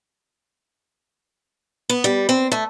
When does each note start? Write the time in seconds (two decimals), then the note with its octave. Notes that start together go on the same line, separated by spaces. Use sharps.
1.89 B3
2.04 G3
2.29 C4
2.52 A3